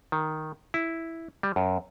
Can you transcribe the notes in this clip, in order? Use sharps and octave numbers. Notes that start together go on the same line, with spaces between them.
D#3
E4
G3
F#2